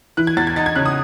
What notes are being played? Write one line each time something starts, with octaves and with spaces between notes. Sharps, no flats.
E3 F#6
G#6
E2 A6
G#6
D#4 A6
G#6
C#3 F#6
D#6